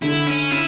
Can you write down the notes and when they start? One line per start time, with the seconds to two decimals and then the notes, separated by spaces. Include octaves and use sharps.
0.03 D3 E4
0.28 C#4
0.52 E4